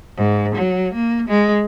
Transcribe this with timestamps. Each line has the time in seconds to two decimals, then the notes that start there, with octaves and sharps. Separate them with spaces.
0.17 G#2
0.55 F#3
0.94 A#3
1.28 G#3